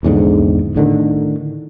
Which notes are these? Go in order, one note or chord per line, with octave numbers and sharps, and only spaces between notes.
A#1 E2 G#2 D3
A2 D3 D#3